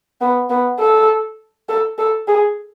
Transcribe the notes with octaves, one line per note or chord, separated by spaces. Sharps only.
B3
B3
A4
A4
A4
G#4